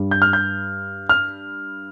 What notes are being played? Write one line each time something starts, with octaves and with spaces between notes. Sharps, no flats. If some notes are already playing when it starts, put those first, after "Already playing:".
Already playing: G2 G3
G6
F6
G6
F6